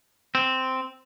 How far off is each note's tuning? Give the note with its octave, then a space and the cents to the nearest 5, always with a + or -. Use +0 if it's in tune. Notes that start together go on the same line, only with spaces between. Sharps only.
C4 -5